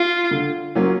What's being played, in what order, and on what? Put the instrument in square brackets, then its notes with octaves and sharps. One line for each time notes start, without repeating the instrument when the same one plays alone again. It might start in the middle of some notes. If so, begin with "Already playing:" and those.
Already playing: [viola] F4
[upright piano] D3
F#3 A#3 C#4 F4